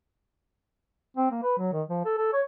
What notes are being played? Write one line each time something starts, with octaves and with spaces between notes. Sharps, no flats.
C4
A#3
B4
F#3
D#3
F3
A4
A4
C#5